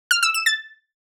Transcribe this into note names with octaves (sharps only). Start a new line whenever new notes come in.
F6
E6
E7
A6